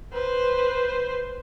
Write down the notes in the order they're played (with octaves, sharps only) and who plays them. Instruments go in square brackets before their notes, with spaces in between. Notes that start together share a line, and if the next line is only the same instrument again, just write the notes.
[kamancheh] B4 C5